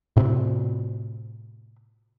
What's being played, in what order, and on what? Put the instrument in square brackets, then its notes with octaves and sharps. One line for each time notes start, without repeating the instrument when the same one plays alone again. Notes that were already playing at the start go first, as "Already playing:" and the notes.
[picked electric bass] A2 C3